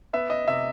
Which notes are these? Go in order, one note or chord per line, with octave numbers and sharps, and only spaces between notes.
B3 E5
D#5
C3 E5